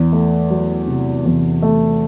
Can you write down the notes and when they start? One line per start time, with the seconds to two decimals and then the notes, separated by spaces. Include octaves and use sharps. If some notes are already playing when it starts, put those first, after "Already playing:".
Already playing: E2
0.12 A3
0.50 F#3
0.87 C3
1.26 E2
1.62 A3